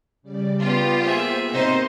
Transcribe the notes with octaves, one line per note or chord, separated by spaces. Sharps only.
C#3 G3 D5
B3 F4 G4
A#3 B3 G#4 C5 E5
C3 C4 D#4 C5 D#5